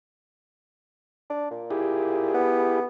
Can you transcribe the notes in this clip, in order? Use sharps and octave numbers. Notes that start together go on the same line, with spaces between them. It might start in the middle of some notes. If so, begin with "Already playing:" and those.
D4
A#2
E4 G4 G#4
B3